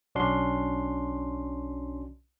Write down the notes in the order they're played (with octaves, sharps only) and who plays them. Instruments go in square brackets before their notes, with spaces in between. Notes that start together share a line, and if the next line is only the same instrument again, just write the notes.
[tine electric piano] B1 C#4 D4 F#4 C6